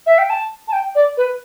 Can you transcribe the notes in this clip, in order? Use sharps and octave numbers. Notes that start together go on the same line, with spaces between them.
E5
G5
A5
A5
G5
D5
B4